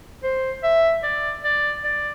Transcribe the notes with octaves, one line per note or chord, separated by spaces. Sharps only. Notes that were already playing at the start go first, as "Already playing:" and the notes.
C5
E5
D5
D5
D5